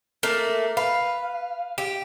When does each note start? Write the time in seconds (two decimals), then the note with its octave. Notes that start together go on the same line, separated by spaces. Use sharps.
0.23 A3 A#3
0.77 B4 F5
1.78 G4